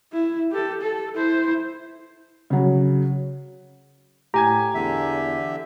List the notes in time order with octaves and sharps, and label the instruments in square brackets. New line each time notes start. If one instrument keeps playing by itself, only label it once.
[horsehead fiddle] E4
G4 A4
A4
E4 C5
[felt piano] C#3 F#3
[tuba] A2 [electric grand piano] G4 G#5 G#6 [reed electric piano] A#5
[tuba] E2 [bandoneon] D3 E5